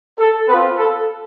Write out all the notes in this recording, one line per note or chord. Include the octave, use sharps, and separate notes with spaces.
A4
B3 C4 F4 B4
A4